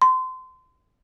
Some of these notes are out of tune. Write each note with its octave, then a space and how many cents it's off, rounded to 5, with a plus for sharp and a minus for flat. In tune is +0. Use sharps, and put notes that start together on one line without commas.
C6 -25